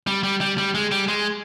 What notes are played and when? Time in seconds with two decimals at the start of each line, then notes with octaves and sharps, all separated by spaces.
0.07 G3
0.23 G3
0.41 G3
0.58 G3
0.75 G#3
0.91 G3
1.08 G#3